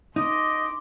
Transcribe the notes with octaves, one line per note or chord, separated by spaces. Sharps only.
D#4 D#5 C6 D6